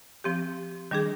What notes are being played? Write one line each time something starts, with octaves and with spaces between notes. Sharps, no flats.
F3 C4 G4
D#3 G3 D4 G#4